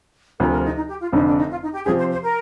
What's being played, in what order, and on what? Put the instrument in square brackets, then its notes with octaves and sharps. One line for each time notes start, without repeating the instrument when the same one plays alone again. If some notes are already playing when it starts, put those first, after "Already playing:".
[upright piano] D2 C3 F3 [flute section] A#4
[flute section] A#4
D#4
D#4
G4
F4
[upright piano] F1 F2 D3 [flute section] D#4
[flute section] D4
D#4
F4
D#4
G4
[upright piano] C3 F3 C4 G4 [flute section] G#4
[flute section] C5
C5
A#4